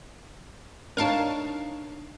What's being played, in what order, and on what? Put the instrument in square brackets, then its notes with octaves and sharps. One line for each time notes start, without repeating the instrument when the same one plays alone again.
[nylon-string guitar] D4 D#4 C#5 [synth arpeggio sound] A#4 F5 A5